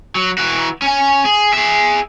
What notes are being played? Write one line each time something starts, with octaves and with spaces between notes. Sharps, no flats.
F#3
E3 F#4
C#4 G#5
G#4
G#4 E5